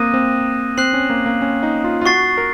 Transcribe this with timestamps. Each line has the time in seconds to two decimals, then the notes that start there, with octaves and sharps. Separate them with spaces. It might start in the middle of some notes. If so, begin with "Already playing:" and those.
Already playing: A#3 C4 D#6 F#6 A#6 D#7
0.14 C4
0.77 C4 F#6 C7 F#7
0.94 C#4
1.10 A#3
1.26 A#3
1.42 C#4
1.63 D#4
1.84 F4
2.01 F4
2.06 F#4 C#6 A6 C7
2.38 A#4